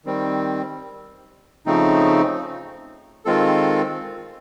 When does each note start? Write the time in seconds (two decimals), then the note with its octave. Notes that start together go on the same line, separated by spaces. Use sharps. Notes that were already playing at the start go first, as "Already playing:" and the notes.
0.05 D#3 G3 C4
1.66 C#3 F3 A3 C4 D#4
3.25 D#3 G#3 C4 F4 A4